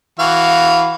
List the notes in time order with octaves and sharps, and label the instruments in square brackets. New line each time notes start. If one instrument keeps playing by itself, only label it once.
[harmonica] E3 F#4 F5